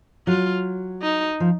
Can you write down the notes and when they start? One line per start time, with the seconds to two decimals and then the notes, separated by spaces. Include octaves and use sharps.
0.27 F#3 F4
1.03 D#4
1.40 F3